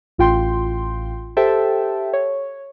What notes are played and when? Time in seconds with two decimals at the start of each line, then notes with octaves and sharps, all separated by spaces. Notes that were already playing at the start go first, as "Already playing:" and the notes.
0.18 A1 F4 G5 C6
1.37 G4 A4 C5 E5 G5 A5
2.13 C#5